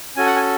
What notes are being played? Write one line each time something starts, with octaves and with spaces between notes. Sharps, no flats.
C#4 F#4 A4 G#5
F#5
G#5